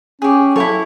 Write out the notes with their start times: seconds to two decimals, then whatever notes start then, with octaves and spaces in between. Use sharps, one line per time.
0.22 C#4 G4 G#4
0.56 F#3 E4 F4 A4 C#5